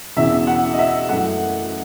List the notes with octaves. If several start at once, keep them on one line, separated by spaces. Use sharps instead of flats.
E1 E2 C#3 E5
F#5
D#5
E5
F#2 E3 A3 F#5